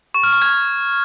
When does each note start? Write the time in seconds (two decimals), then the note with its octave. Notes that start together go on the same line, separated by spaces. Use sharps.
0.14 C#6
0.24 F6
0.33 C#6
0.42 G#6